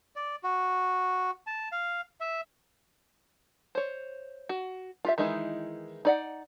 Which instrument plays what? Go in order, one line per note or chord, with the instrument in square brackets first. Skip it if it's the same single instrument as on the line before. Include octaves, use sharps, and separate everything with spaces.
[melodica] D5
F#4
A5
F5
E5
[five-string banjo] C5 C#5
F#4
F4 G4 E5
D#3 E3 G#3 D#4 E4
D#4 D5 F#5